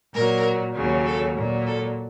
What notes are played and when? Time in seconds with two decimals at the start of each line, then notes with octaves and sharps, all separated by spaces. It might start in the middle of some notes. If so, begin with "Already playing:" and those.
0.13 A#2 F#3 A#4
0.75 D#2 C#3 F#3
1.05 A4
1.35 A#2 F#3
1.67 A4